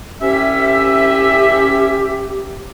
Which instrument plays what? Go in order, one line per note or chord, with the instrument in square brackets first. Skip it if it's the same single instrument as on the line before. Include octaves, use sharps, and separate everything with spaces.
[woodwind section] C2 C#4 E5 [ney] G4